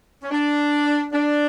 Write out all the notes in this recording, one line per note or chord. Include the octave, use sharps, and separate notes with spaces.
C#4
D4
D4